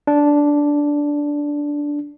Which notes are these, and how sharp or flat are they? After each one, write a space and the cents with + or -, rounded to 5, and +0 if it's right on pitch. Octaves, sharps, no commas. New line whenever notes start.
D4 -10